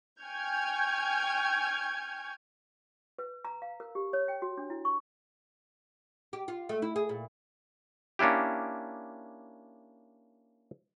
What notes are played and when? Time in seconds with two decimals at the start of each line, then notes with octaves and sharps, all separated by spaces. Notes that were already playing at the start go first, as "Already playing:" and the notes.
0.22 G5 G#5 C#6 F6 G6 G#6
3.18 B4
3.45 A#5
3.62 F5
3.80 A#4
3.95 G4
4.13 C#5
4.28 G5
4.42 F#4
4.58 D4
4.70 E4
4.85 C#6
6.33 G4
6.48 F4
6.69 A3
6.82 E4
6.96 G#4
7.09 A#2
8.19 A#3 C#4 D4 E4 G4